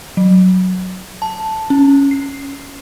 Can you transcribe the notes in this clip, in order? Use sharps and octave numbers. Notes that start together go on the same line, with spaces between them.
F#3
A5
C#4
C7